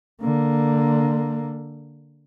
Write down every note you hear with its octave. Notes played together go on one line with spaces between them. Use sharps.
D3 A#3